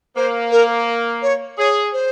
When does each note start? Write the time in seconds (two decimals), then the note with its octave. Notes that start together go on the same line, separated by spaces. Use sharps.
0.16 A#3 C5
0.51 A#4
1.22 C#5
1.58 G#4 C#5
1.93 C5